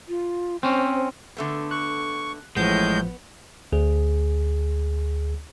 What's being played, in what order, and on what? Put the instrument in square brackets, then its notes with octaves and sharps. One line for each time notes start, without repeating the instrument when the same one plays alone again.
[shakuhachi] F4
[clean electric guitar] C4 C#4 [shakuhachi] C5
[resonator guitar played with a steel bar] D3 A3 B3
[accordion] C#6 [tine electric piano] F#6
[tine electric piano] A1 F3 [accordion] A2 G6 [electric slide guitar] G#3 [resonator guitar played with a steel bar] B3
[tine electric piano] D2 G#4